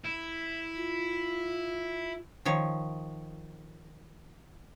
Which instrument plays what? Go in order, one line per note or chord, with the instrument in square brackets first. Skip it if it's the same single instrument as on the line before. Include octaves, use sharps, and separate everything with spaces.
[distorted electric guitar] E4
[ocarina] F4
[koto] D#3 F3 C#5